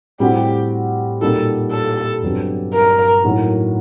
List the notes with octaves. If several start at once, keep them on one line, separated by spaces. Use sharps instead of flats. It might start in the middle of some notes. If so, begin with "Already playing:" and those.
A2 G3 C4 F#4 G4
A#2 G3 A#3 D#4 F#4 A4
A4
G1 G2 F#3 C4 G4
A#4
A2 F#3 A#3 D#4 F#4